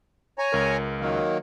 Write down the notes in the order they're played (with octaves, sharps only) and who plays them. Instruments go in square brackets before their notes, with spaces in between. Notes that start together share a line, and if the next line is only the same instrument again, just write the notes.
[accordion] C#5 G#5 A#5
[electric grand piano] C#2 A#4
[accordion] D#3 F#3 A#3